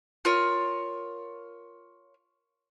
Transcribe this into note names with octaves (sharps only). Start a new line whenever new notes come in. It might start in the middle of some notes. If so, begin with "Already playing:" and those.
F4 A#4 C#5